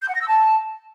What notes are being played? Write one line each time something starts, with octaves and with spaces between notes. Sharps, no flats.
G6
F#5
A#6
E6
A5